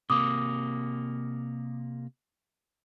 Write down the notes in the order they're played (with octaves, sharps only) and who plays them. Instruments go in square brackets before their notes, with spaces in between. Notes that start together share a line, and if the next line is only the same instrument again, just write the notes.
[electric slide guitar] C3 A#3 [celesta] D6 D#6